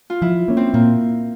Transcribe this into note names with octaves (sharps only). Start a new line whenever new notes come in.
F4
F3 E4
A#3 C#4
C4
A#2 A#3